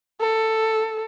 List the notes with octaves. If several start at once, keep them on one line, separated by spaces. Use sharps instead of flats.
A4